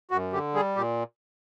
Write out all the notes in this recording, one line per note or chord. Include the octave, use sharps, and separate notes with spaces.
F#2 F#4
D3 G4
G3 G#4
A#2 G4